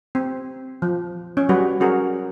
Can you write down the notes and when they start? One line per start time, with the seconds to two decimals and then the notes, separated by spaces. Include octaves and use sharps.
0.15 C4
0.82 F3
1.37 C#4
1.49 F#3 G3 F#4 G4 B4
1.80 C#4 F#4 G#4 A#4